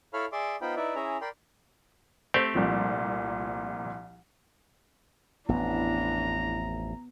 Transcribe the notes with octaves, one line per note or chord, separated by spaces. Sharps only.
E4 A4 C#5 F5 B5 F6
G#4 D5 E5 C6 D6
B3 D#4 F4 C5 G5 B5
D#4 E4 B4 D5 E5
C#4 E4 G#4 E5 A#5
A#4 D5 G5 B5 C6
A3 C4 G4 C5
C2 A#2 F3
A1 F2 B3 D4 E4 A#5